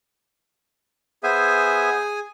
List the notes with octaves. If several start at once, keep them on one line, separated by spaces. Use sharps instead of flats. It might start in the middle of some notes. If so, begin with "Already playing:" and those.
B3 G#4 C5 E5 G#5